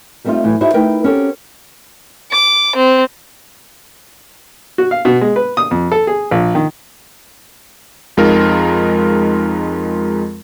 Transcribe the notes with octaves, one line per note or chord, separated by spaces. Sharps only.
G3 A3 C4 C#4 D#4 F4
A2 E3 F#3
D#4 E4 F#4 G#4 C5 D#5
A3 D#4 E4 A#4 B4 G5
C4 C#4 F#4 G4 A4 A#4
D6
C4
F#4
F5
B2
G#3
B4
D#6
F2
A4
G#4
A#1
D#3
F2 G#3 D#4 F4 A#4